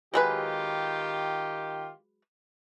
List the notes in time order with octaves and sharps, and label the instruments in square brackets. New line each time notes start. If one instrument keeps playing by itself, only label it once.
[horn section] D#3 F4 G4 [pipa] F#3 G#3 B4